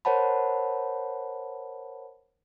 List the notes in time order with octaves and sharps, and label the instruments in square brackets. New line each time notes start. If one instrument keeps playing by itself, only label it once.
[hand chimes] A#4 C5 C#5 F#5 A5 B5